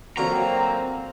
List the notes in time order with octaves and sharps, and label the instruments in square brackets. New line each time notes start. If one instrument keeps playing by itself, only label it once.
[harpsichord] D3 F4 F#4 [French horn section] F#3 A#3 C4 [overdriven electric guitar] A#5